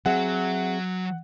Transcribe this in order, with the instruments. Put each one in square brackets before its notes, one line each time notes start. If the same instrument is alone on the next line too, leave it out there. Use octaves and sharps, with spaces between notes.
[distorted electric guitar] F#3 [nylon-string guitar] C4 G#4 E5 [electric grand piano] F#5